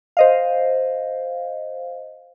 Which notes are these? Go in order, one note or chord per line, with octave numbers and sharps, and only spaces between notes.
C5 D#5 F5